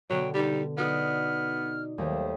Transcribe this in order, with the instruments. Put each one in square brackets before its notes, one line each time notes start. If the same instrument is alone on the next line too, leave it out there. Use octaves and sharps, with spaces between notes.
[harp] B2 D3 [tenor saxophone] F#3 [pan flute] G5
[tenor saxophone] G3 [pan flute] D#4
[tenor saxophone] B3 [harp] D#4 F#4 D5 [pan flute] F6
[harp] D#2 G3 A3 [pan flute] C5